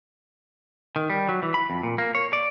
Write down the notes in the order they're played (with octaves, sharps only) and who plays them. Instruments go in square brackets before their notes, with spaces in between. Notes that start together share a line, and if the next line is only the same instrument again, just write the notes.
[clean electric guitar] D#3
G3
F#3
E3
B5
F2
A#2
A#3
C#5
D5